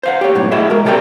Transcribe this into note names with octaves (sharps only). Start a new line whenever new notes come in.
C5 F5 F#5
G4 C#5
B1 F#2 A2
E4 F#4 G#4 D#5 E5
G#3 A#4
B2 G4 A4 A#4 D5 G5